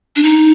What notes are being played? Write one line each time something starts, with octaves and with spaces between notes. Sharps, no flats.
D4
D#4